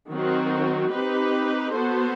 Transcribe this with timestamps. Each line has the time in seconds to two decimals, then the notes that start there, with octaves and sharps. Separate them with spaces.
0.10 D#3 F#3 C4 F#4
0.92 C4 D#4 G4 B4
1.75 B3 F#4 A4 C5